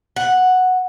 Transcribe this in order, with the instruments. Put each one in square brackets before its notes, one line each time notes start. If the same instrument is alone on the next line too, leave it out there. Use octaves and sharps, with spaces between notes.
[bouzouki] F#5